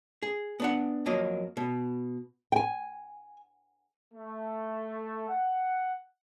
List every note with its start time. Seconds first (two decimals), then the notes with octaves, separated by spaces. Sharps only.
0.22 G#4
0.60 B3 D4 F#5
1.06 F2 F#3 A#3 D#5
1.57 B2
2.52 G5 G#5
4.14 A3
5.29 F#5